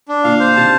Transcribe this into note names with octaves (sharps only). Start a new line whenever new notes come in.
D4
A#2 D3 F5
C5
D3
C3 D#3 A5